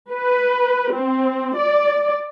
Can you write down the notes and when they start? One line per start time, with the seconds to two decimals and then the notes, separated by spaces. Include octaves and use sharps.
0.11 B4
0.93 C4
1.57 D5